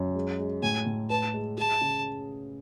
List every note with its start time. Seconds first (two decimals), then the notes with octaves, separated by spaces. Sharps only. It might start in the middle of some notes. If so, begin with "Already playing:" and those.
Already playing: F#2
0.15 G#3
0.39 G#3
0.63 A2 G#5
0.86 A2
1.10 B4 A5
1.34 G#3
1.58 G#4 A5
1.81 C#3